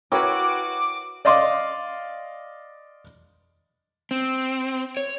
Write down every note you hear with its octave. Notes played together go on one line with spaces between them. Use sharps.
E4 F#4 A#4 B4 C#5 G5 D6
D5 D#5 F5 C6 D6
C4
C#5